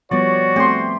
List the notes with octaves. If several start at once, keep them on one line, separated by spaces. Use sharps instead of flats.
F3 G3 B3 F#4 C#5 D5
A3 C4 G4 C6